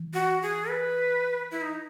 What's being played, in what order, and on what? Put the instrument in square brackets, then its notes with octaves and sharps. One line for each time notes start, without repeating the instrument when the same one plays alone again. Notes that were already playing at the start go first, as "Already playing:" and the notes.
Already playing: [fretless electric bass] E3
[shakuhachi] F#4
G#4
B4
E4
D#4